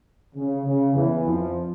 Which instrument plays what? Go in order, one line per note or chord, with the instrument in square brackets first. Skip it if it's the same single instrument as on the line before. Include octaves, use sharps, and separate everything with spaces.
[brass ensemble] C#3
C#3
E2 E3
F2 F3